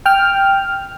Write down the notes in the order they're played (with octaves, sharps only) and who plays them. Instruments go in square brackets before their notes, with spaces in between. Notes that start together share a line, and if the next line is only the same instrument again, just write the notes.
[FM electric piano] G5 F6